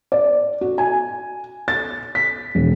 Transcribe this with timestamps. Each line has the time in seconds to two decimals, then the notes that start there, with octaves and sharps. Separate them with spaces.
0.12 D5
0.61 F#4
0.78 G#5
1.68 A6
2.15 B6
2.55 E1